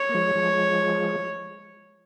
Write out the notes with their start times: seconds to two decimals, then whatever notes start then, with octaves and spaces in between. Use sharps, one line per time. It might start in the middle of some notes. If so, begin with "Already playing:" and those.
Already playing: C#5
0.09 A#3
0.14 F3 G#3
0.35 F3 G#3